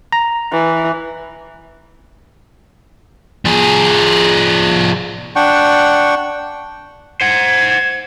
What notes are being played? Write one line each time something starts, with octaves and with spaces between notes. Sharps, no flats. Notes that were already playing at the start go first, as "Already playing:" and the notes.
A#5
E3
F3 G#4
D4 F#5 G5 C#6
C5 F#5 G#6